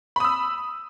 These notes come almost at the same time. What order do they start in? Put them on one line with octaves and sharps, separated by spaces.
B5 D#6 E6